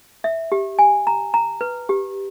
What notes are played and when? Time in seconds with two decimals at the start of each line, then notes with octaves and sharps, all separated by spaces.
0.24 E5
0.52 G4
0.79 G#5
1.07 A#5
1.34 A#5
1.61 B4
1.89 G4